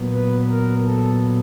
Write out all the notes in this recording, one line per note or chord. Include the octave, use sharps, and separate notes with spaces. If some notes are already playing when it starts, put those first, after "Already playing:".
Already playing: A#2 F#3 B3
B4
A#4
A4